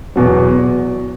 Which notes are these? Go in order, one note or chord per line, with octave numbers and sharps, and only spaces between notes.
E2 B2 F#3